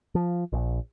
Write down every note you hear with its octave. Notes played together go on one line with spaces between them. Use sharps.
F3
A#1